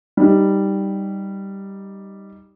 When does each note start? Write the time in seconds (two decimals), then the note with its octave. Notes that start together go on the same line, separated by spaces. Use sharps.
0.17 G3 D#4